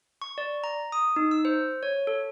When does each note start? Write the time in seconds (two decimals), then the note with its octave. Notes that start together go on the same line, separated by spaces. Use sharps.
0.22 C#6
0.38 D5
0.64 A#5
0.92 D#6
1.16 D#4
1.31 E6
1.45 C5
1.83 C#5
2.07 A4